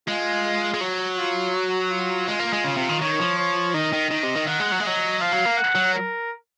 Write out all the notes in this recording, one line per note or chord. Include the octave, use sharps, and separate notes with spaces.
G#3 F4
G#3
F#3
F4
F#4
F4
G#3 F4
A#3
G#3
C#3
C3
D#3
D#3 C#5
F3
C#5
D#3 D#5
D#3
D#3
C3
D#3
D#3 F#5
G#3
F#3
G#3
F#3 D#5
F3 F5
F#3
A#3
F#5
F#3
A#4